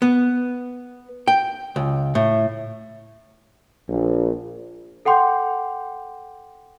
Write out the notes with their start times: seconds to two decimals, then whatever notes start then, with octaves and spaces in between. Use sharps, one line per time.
0.02 B3
1.28 G5
1.76 C#2
2.15 A2
3.89 A#1
5.05 A4 F#5 G5 C6 D6 G6